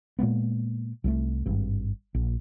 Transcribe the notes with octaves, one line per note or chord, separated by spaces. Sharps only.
A#2 G#3 A#3 B3
C2 F#3 A3
G#1 G2
A#1